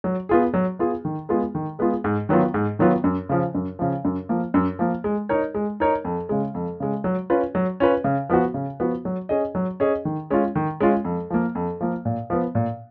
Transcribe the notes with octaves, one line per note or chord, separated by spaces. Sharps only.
F#3
B3 F4 G#4
F#3
B3 F4 G#4
D#3
G#3 B3 F4 G#4
D#3
G#3 B3 F4 G#4
G#2
D#3 F#3 B3 F4
G#2
D#3 F#3 B3 F4
F#2
C#3 F3
F#2
C#3 F3
F#2
F3 A#3
F#2
F3 A#3
G#3
D#4 A#4 C#5
G#3
D#4 A#4 C#5
F2
C#3 G#3
F2
C#3 G#3
F#3
C#4 F4 B4
F#3
C#4 F4 B4
C#3
F3 B3 F#4
C#3
F3 B3 F#4
F#3
C#4 G#4 D#5
F#3
C#4 G#4 D#5
D#3
G#3 C#4 F4
D#3
G#3 C#4 F4
F2
F3 A#3
F2
F3 A#3
A#2
F3 B3
A#2